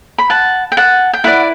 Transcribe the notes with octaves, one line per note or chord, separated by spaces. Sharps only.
B5
F#5 A5
G5
F#5 A5
G5
E4 B4 D5 F#5